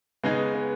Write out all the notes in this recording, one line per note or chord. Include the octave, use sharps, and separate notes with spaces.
C#3 G#3 B3 D#4 G#4
B3